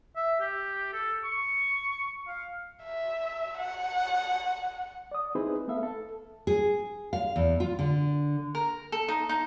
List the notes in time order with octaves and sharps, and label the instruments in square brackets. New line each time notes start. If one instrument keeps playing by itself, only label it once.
[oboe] E5
G4
A4
C#6
F5
[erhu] E5
F#5
[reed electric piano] D5 D#6
C4 D#4 E4 G#4 B4 C5
A3 B3 A4 E5 F5
A4
[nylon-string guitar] G#4
F5
E2
F4
D3
[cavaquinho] A#4
A4
D#4
D#4